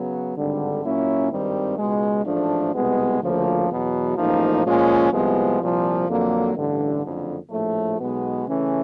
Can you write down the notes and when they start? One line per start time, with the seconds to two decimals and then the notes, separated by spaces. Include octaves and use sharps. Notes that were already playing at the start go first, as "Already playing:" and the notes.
Already playing: C#3 F#3 B3
0.35 G#1 G2 D3 G3
0.83 A#2 F#3 A#3 C#4 E4
1.30 G#1 G2 D#3 G3 C4
1.78 C#2 B2 G#3
2.25 A1 G#2 F3 A3 D4
2.74 C2 B2 G#3 B3
3.21 D2 C#3 F3 A#3
3.69 E2 B2 F#3
4.17 A1 G#2 F3 A#3 D#4
4.64 A#2 F3 G#3 C#4 F4
5.12 C2 C3 F3 G#3 B3
5.60 C2 A#2 F3
6.07 F2 D3 F#3 A#3
6.55 A1 G2 D3
7.03 F#1 F2 D3
7.51 A#1 A2 F3 A3
7.98 B1 B2 G#3 B3
8.46 C#3 E3 A3 C#4